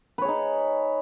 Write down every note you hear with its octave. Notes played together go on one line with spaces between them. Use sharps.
D#4 G#4 B4 C#5